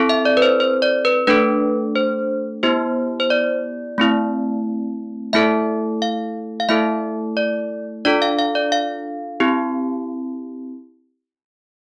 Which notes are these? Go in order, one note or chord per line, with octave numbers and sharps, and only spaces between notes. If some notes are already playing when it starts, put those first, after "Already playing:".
Already playing: C4 E4 A4
E5
D5
B4
C5
C5
D5
B4
A3 D4 A4 B4
C5
B3 E4 G4 C5
C5
D5
A3 C4 E4
A3 E4 A4 E5
F5
F5
A3 E4 A4 E5
D5
D4 F4 A4 D5
F5
F5
D5
F5
C4 E4 G4